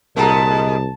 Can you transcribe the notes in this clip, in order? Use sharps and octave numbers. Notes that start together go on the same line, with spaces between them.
C2 A2 G#3 B3 A#4 A5 A#5